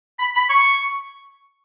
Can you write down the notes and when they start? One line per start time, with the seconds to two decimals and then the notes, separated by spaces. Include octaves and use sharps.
0.19 B5
0.35 B5
0.50 C#6